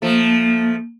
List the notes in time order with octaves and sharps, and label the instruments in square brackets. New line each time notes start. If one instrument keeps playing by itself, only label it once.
[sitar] F3 A3 [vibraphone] A#3